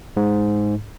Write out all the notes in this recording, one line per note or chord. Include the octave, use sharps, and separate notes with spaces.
G#2